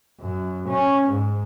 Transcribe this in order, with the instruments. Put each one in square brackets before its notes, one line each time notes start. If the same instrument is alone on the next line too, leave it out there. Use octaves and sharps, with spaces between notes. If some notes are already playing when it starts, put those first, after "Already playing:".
[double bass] F#2
C#4
G#2